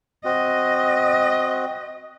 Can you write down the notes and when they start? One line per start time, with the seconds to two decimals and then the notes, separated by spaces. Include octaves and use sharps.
0.25 C4 F#4 D#5